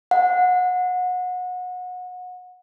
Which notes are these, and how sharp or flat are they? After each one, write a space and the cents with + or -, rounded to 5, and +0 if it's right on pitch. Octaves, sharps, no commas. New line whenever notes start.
F#5 -25